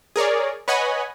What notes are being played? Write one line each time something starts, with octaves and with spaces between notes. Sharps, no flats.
G#4 A#4 C#5 D5
B4 C#5 D#5 F#5 G#5 B5